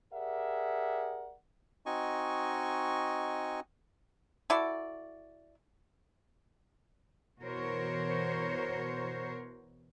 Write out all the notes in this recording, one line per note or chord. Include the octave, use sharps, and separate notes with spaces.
G4 G#4 A#4 D5 E5 F#5
C4 D#4 F#4 D#5 G#5 C#6
E4 F#4 A4 D5
B2 E3 F#4 A#4 C5 C#5